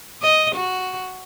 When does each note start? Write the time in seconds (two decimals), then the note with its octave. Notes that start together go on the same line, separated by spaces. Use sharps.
0.22 D#5
0.56 F#4